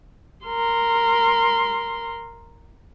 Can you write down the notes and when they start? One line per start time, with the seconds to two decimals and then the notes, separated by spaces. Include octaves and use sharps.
0.46 A#4 C6